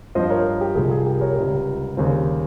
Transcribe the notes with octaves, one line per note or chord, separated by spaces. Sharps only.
G2 F3 C4 C5 D#5
A#4 C#5
G4
C2 C3 F3 G#4
G#4
G4 A#4
A#4 C#5
C#2 C3 G3
D#2 C#3 G3 C4